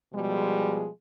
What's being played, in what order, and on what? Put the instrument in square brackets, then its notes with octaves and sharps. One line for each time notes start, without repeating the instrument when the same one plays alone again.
[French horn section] B2 F3 G3 G#3